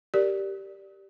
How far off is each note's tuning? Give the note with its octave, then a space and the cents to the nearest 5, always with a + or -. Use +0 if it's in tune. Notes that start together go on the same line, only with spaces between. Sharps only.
G4 -5 A#4 +0 D5 +0